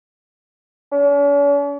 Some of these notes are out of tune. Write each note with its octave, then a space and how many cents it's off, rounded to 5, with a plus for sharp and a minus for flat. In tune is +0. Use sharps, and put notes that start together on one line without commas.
C#4 +45